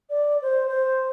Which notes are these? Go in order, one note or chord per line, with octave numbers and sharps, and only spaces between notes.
D5
C5
C5